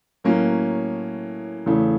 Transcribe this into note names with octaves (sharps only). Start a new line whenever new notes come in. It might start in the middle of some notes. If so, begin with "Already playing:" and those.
A2 F#3 A#3 C#4
E2 C#3 E3 A3